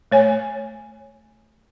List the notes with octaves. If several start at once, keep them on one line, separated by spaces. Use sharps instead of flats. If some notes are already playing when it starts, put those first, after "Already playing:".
A3 C#5 G#5